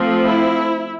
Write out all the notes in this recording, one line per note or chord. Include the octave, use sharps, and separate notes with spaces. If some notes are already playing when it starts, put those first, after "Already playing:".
Already playing: F3 A3 C4
E4